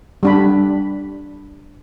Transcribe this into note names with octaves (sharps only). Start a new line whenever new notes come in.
G3 D4 B5